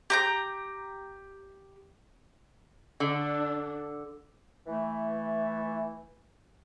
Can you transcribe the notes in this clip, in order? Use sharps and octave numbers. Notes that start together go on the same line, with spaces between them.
G4 A#5 G6
D3 D4
E3 A3